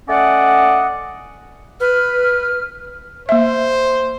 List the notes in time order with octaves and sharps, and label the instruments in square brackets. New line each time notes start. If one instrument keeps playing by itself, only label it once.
[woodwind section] A3 C#4 D5 D#5 F#5
[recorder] B4 [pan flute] F6
[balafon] A#3 E5 [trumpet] C5